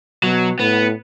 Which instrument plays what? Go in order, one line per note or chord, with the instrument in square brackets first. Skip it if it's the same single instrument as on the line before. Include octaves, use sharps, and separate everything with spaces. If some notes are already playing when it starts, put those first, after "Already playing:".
[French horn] B2 [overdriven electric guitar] F#3
[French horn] A2 [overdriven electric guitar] B3